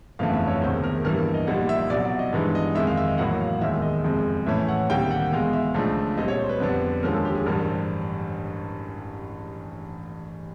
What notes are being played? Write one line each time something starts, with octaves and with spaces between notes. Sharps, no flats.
G1 F2 C#3 E3 A3 F5
E5
C#5
E1 D2 C3 D#3 C5
A#4
G2 E3 G3 A#3 A#4
D#5
A#1 A#2 G3 A#3 D#4 F#5
E5
C2 B2 F#3 D5
D5
D#5
G2 E3 G#3 B3 D#4
D#5
F2 C3 D#3 G#3 E5
F5
E5
D#5
A1 A2 F#3 A#3 F#5
F5
E1 D#2 D#3 G#3 E5
D#5
F#1 F2 C3 F3 G#3
A2 E3 A3 C#4 E4 E5
F#5
D2 C3 D#3 G3 A#3 G5
F#5
E2 B2 G#3 F5
E5
C#2 C#3 F3 A3 D4
A#2 G3 C4 D#5
C#5
C5
B4
F2 D3 G3 B3 D4
D#2 D3 F3 G#3 C#4 A#4
A4
G4
G#4
A1 G2 D3 G3 A#4
C5